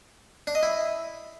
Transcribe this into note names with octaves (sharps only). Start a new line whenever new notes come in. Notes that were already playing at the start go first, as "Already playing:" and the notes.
D4
D#5
E4